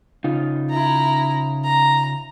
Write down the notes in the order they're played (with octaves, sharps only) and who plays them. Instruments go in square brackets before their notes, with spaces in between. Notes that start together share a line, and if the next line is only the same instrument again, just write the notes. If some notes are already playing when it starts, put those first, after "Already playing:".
[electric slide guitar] C#3 D#4 F4
[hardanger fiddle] E4 A#5
A#5